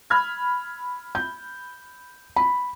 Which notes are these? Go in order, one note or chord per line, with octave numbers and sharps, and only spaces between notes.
B5 F6 G#6
G6
B5